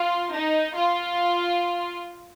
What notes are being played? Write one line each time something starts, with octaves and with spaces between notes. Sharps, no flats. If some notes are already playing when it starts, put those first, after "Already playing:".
Already playing: F4
D#4
F4